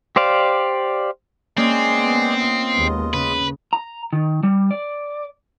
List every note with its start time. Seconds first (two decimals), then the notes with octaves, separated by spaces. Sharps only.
0.16 G4 C5 D5 F5
1.57 G#3 A#3 C4 C#4 G#4 D5
1.92 B3
2.40 F4 D#5
2.74 D#2 G#3 B3
3.14 C#3 B4
3.73 A#5
4.13 D#3
4.43 G3
4.71 D5